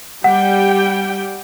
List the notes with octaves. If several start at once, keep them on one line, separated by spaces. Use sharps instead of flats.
G3 F#5 G5